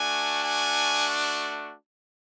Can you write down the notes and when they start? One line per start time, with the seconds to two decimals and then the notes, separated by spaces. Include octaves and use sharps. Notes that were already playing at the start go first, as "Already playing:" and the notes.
Already playing: A3 D4 F#4 G#5
0.45 G#5